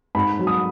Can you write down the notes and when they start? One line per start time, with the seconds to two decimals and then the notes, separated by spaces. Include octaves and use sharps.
0.15 G#2 B5
0.39 F#3
0.47 D#6